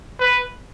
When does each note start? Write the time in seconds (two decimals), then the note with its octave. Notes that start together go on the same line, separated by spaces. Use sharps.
0.20 B4